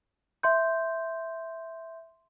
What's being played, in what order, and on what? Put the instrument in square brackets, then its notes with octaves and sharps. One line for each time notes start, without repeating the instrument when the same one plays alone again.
[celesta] E5 C6 G6